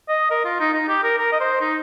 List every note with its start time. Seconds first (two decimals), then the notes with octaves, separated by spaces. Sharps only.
0.09 D#5
0.31 A#4
0.45 F4
0.60 D#4
0.74 D#4
0.88 G4
1.03 A#4
1.18 A#4
1.32 D#5
1.40 C5
1.61 D#4